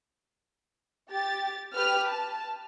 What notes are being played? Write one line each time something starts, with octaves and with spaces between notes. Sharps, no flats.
G4 A6
G4 B4 F6
A5